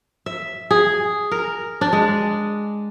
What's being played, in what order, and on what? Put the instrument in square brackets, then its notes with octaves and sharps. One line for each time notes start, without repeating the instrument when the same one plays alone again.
[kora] E5
G#4
A#4
D4
G#3